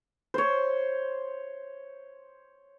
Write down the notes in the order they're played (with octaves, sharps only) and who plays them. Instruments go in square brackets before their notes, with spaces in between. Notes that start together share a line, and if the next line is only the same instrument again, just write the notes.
[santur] C5 C#5